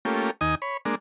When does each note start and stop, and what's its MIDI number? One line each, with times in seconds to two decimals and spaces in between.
0.05 0.31 57
0.05 0.31 58
0.05 0.31 61
0.05 0.31 65
0.05 0.31 67
0.41 0.55 39
0.41 0.55 63
0.41 0.55 75
0.41 0.55 80
0.41 0.55 87
0.62 0.77 73
0.62 0.77 83
0.85 0.95 56
0.85 0.95 58
0.85 0.95 62